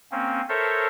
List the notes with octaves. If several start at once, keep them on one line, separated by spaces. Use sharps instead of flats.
A#3 C4 C#4
A4 A#4 C5 C#5 E5